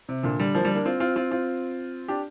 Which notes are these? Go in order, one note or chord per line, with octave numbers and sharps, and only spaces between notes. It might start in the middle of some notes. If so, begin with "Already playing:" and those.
C3
A#2 D3
D3 G3
F3 A#3
D3 G3
A#3 D4
C4 F4
C4 F4
C4 F4
C4 F4
D4 G4